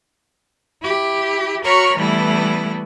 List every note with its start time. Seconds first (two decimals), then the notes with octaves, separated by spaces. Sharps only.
0.81 E4 G4
1.64 F#4 A#4 C#5 B5 C#6 F6
1.96 E3 G3 A3 B3 E4